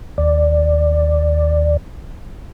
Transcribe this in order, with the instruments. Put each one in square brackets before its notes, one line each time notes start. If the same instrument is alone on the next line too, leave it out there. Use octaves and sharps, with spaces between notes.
[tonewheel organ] D#2 D5